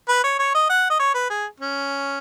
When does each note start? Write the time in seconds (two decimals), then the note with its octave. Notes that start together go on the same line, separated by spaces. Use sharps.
0.09 B4
0.24 C#5
0.39 C#5
0.55 D#5
0.70 F#5
0.90 D#5
1.00 C#5
1.14 B4
1.30 G#4
1.60 C#4